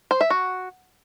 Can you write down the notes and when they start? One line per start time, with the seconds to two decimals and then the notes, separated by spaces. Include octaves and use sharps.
0.11 C5
0.21 E5
0.30 F#4